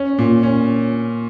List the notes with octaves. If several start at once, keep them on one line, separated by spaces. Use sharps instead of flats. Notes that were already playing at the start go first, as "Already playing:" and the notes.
Already playing: C#4
A#2
C#4